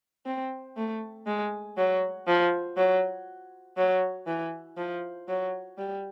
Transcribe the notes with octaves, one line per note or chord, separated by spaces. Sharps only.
C4
A3
G#3
F#3
F3
F#3
F#3
E3
F3
F#3
G3